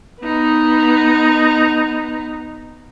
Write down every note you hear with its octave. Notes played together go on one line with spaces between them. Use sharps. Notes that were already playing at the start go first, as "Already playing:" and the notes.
B3 D#4